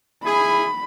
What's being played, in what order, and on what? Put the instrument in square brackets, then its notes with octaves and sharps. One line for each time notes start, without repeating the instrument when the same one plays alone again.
[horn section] E4 G#4 [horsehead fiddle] B5